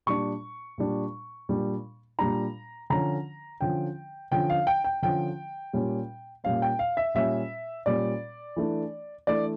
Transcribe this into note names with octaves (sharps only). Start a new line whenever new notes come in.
A#2 G3 D4 C#6
A#2 G3 D4
A#2 G3 D4
A#2 G3 D4 A#5
D3 F3 C#4 A#5
D3 F3 C#4 G5
D3 F3 C#4 G5
F5
G5
G5
D3 F3 C#4 G5
A#2 G3 C#4
A#2 G3 C#4 F5
G5
F5
E5
A#2 G3 C#4 E5
A#2 G3 C#4 D5
E3 A3 D4
E3 A3 D4 D5